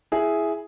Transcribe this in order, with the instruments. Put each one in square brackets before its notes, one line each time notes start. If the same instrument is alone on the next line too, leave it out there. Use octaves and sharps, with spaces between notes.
[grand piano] E4 G#4